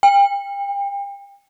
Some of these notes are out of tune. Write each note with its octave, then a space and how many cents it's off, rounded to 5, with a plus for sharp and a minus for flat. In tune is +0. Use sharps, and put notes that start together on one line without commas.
G5 +35